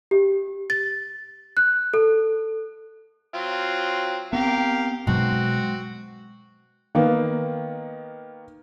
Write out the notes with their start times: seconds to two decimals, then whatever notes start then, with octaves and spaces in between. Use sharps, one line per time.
0.11 G4
0.70 A6
1.57 F#6
1.94 A4
3.34 F#3 C4 F4
4.33 B3 C4 G4 A#4 F5
5.07 B2 F#3 G#3 C4 F#4
6.95 D#3 A#3 B3